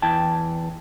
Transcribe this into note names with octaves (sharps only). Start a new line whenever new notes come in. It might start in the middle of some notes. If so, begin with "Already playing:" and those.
E2 E4 G5 A5